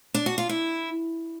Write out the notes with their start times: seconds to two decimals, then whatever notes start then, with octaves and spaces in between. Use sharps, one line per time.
0.14 D4
0.26 F#4
0.38 F4
0.49 E4